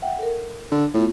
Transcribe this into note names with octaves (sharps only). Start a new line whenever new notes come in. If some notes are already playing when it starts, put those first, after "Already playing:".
E5 F#5 G5
A4 A#4
D3
A2 B3 F4